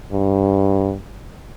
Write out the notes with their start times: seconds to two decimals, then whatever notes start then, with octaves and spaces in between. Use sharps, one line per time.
0.12 G2